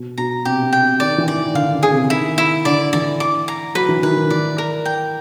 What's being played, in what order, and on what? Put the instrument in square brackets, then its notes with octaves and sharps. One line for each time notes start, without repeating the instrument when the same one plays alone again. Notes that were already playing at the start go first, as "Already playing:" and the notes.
Already playing: [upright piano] B2
[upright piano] B2 [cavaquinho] A#5
[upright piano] C3 [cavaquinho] G4
[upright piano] C3
[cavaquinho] G5
[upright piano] C3
[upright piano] D#3 [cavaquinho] D5
[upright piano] E3
[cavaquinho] D5
[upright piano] D#3
[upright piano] D3 [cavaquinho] F5
[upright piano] C#3
[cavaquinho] G#4
[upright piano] C3
[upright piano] D#3 [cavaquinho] E4
[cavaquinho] E4
[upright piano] D3 [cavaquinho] D5
[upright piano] E3 [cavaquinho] D5
[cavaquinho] D6
A#5
[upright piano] F#3 [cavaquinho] B4
[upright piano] E3
[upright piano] D#3 [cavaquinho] B4
[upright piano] D#3
[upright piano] E3 [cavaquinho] D5
[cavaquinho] A#4
G5